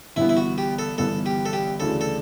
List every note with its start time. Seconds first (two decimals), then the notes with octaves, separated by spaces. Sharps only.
0.16 G1 G2 E3 B3 E4
0.29 E4
0.37 F#4
0.58 G4
0.79 A4
0.98 G1 G2 E3 B3 A4
1.26 G4
1.46 A4
1.53 G4
1.80 D2 C#3 E3 A3 D4 A4
2.01 A4